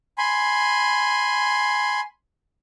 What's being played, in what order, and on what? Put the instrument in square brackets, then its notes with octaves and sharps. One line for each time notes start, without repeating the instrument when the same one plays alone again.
[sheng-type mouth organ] G#5 B5 C6